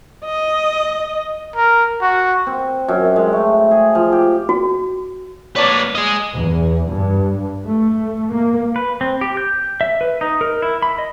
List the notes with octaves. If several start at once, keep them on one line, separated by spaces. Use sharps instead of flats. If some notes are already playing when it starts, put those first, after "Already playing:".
D#5
A#4
F#4
C4
F#2
G#3
A3
G#4
F3
G4
F#4
A#3 B4 C#5 D5 A5
G#4 D#5
E2
G2
A3
A#3
B4
C4
G4
G6
E5
B4
D#4
A#4
E4
B5
D#5